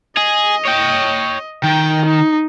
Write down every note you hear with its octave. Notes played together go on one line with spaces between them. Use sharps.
G#4 D#5
C#5 G5
D#3 G5
D#4